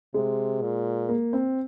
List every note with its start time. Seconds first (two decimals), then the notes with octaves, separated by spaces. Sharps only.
0.14 C3 G#3
0.62 A#2
1.09 A#3
1.33 C4